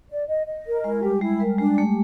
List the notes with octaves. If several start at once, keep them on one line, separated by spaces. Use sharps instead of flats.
D5
D#5
D#5
A#4
G#3 E4
G3 G4
G#3 E4
G3 A#4
G#3 D4
A3 G4